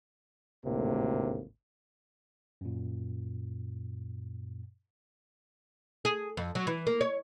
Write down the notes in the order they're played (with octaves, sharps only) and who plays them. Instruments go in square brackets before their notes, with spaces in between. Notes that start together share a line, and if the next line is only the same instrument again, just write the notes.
[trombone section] G#1 D2 A2 C3 A#3
[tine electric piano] F#2 A#2
[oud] G#4
F2
F#3
E3
A#3
C#5